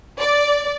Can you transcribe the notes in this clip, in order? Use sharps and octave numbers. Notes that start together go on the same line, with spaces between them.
D5